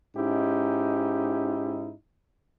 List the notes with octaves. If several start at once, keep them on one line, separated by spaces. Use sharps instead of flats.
G#2 C#4 D#4 E4 G4